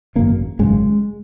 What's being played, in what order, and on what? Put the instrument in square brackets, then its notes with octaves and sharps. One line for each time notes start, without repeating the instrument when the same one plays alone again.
[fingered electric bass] G#1 F#2 C#3 A#3
G#1 F#2 C#3 G#3